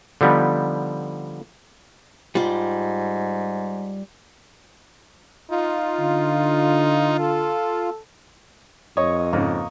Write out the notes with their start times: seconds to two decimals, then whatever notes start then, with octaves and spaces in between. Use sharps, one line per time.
0.21 D3 F3 G3 B3 D#4
2.35 G#2 G3 F4
5.51 D#4 F4
5.99 D3
7.19 A4
8.97 F2 C#5 D#5 C#6
9.33 G#2 C#3 A#3